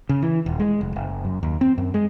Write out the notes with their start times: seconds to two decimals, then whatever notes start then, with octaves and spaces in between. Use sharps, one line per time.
0.09 C#3
0.22 E3
0.46 D#1
0.60 G#3
0.81 F1
0.96 F#1
1.25 F#2
1.43 D#2
1.61 C4
1.78 F#2
1.94 G#3